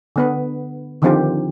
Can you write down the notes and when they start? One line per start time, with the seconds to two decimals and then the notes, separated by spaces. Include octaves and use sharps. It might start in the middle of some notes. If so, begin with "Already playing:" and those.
0.16 D3 B3 B4
1.02 D3 D#3 F3 C4 F4 G4